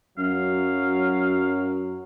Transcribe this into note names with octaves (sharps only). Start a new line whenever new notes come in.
F#2 F#3 F5